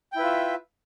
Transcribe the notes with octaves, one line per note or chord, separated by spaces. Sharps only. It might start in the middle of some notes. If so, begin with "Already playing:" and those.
E4 F4 B4 E5 G5